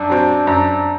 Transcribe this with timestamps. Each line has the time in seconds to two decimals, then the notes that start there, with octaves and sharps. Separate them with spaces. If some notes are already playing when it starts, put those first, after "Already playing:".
Already playing: F#2 D4
0.10 F#3 C4
0.47 F#2